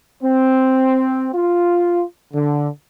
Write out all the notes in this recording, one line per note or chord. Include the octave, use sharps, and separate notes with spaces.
C4
F4
D3